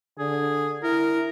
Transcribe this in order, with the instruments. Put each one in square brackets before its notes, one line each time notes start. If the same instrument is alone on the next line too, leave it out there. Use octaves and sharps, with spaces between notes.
[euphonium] D3 [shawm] G#4
[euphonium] E4 [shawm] A#4